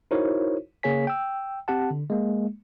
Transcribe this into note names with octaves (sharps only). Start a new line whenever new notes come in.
D#4 E4 F#4 A#4 C5 C#5
C#3 A#3 G#4 C#5 G#5 B6
G5 E6
C4 G4 F#5 A5
D3
G#3 A#3